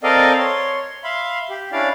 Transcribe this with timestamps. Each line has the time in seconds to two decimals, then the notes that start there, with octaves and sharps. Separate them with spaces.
0.03 C4 A4 A#4 D5 D#5 F5
0.39 C#5 C6
1.04 E5 F5 B5 C6
1.50 G4
1.72 C#4 D4 E4 D5 F5